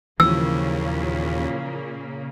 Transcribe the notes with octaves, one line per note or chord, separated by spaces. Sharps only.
D#2 A#2 C#3 E3 F3 A#3 E6